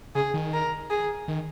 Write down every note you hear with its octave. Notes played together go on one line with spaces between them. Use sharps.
C#3 G#4
D#3
A#4
G#4
D#3